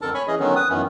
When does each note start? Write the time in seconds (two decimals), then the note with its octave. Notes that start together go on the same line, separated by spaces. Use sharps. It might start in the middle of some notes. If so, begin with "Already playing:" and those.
0.01 F2 D3 A4 A#4 A5
0.14 C#5 G#5 B5 C#6
0.28 E3 C#4 G#4 D#5
0.40 D3 D#3 F#3 B3 C#4
0.56 B4 D#6
0.69 F#2 D#3 E3 B3 C#4